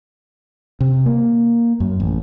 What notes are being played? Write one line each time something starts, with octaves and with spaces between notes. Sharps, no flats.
C3
A#3
F#2
A1